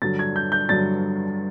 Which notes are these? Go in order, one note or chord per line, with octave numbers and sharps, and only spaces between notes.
G2 D3 F#3 A6
G#6
G6
G6
G2 D3 F#3 A6